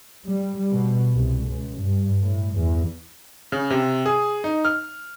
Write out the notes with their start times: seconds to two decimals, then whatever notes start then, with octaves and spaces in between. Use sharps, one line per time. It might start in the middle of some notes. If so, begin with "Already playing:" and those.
0.24 G3
0.71 B2
1.12 C2
1.48 C#2
1.77 G2
2.21 A2
2.54 E2
3.52 C#3
3.70 C3
4.06 G#4
4.44 D#4
4.65 F6